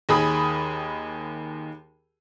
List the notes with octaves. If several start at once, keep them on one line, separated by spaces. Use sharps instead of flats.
D#2 D#3 G#4 B5 D#6